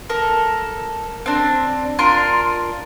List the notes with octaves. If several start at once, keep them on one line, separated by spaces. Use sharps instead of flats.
A4 A#4
C4 D4
D4 F4 A#4 C6